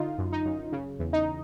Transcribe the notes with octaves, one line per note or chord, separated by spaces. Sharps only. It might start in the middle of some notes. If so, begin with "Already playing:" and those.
Already playing: D3 D#4 F4
F#2
D#4
F#2
C#3
E2
D#4